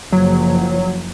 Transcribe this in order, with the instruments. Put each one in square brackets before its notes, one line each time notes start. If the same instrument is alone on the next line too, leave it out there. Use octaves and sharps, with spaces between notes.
[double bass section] F#1 F3 [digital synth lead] F#3